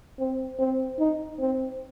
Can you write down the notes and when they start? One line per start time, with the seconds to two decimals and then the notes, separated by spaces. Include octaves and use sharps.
0.20 C4
0.59 C4
0.99 D#4
1.40 C4